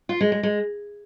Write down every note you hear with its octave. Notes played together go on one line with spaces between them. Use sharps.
F4
G#3
G#3
G#3